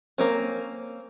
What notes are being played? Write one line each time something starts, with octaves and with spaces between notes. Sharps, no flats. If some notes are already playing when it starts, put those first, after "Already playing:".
A#3 C4 C#4